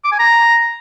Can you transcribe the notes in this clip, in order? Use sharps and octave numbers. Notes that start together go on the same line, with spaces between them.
D6
G#5
A#5